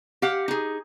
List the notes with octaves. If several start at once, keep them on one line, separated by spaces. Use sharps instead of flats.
G4 F5 F#5
D#4 G#4